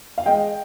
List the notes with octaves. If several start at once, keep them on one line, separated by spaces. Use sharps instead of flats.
F5
G#3 D#5 G5